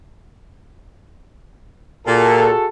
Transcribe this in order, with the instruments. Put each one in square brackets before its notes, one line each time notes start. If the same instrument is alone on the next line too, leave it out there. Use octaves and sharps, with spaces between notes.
[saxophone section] A#2 [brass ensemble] F#4 G#4 A4